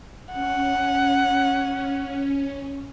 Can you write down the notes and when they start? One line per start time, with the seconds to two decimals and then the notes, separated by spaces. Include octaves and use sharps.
0.33 C#4 F#5